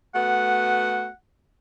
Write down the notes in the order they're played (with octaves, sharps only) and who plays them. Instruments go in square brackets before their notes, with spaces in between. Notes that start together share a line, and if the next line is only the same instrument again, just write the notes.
[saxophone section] A3 B3 F#4 [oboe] F#5